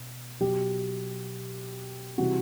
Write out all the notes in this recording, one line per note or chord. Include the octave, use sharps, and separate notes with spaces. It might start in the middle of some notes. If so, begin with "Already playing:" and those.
Already playing: B2
B2 F#3 G4
C3 E3 G3 F#4